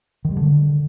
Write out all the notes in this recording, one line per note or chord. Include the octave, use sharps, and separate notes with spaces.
D#3
G3
D3